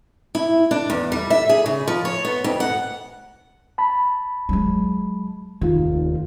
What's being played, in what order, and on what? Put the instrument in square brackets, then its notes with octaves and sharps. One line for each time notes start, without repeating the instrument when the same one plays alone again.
[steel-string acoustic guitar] E4
D4
E2
G3
E5
G#4
C#3
F3
C#5
B3
F2
F#5
[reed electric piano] A5 B5
[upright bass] F#3 G#3
[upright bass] F1 D#2 [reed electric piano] D#3 F4